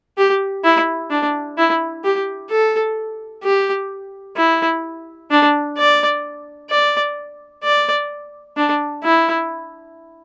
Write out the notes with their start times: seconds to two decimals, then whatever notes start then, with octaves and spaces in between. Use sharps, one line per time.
0.18 G4
0.64 E4
1.11 D4
1.58 E4
2.04 G4
2.50 A4
3.43 G4
4.36 E4
5.30 D4
5.77 D5
6.70 D5
7.63 D5
8.57 D4
9.04 E4